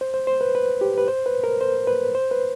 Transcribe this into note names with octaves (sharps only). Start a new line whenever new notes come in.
C5
C5
C5
B4
B4
G4
B4
C5
B4
A#4
C5
B4
C5
B4